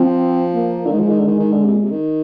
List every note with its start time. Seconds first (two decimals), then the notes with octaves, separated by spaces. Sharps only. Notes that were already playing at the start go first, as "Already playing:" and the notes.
Already playing: F3 C4
0.54 A#3
0.86 D3
0.90 D#3 G#3
1.00 F3
1.09 D#3
1.18 D3
1.27 D#3
1.39 D#3
1.52 D3
1.64 C3
1.73 A#2
1.82 C3
1.91 D#3